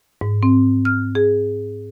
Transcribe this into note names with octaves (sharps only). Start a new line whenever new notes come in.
G#2
C4
F6
G#4